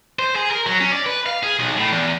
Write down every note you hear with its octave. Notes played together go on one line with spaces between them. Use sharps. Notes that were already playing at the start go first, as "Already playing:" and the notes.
C5
G#4
A#4
F#3
C#4
D5
B4
F5
G#4
B1
A2
E2